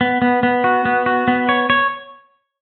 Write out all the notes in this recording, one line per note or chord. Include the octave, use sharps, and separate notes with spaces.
B3
B3
B3
F#4
B3
F#4
B3
C#5
C#5